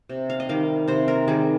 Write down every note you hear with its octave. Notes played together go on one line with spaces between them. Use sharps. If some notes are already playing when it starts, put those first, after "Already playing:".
C3
F5
D#5
D#3 G3 F5
C3 C5
A#4
D#3 G3 G#4